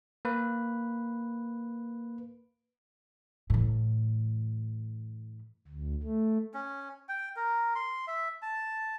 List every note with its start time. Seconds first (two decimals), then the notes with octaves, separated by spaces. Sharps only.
0.25 A#3 B4
3.50 A2 E3
5.68 D2
6.03 A3
6.54 C#4
7.09 G5
7.36 A#4
7.75 C6
8.07 E5
8.42 A5